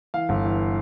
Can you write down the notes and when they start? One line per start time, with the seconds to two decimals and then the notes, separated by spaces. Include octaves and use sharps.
0.14 E3 F5
0.29 G1
0.44 E3